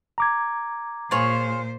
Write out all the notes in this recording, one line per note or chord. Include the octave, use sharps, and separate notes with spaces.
A#5 D6 G#6
A#2 F4 G#4 C5 C#5